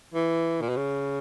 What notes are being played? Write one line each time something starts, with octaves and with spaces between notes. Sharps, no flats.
E3
A#2
B2
C#3